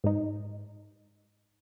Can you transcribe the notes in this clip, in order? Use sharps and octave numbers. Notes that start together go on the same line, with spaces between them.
G#2 D#4